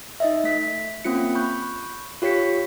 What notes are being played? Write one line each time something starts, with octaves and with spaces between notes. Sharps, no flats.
D#4 D#5 E5
A3 B6
A#3 C4 C#4 F4 C#7
B5 C#6 F#6 G6
F4 G4 C#5 B6 C#7